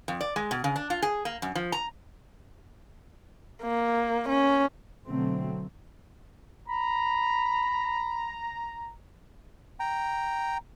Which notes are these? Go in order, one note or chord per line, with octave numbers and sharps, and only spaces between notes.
F2
D5
G#3
B2
C#3
D4
F4
G#4
A#3
F#2
F3
A#5
A#3
C#4
B2 D3 F#3 A3 C4
A#5 B5
G5 A#5